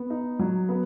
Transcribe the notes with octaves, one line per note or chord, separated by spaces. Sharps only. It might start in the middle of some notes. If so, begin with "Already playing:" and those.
Already playing: B3
D#4
F#3
B3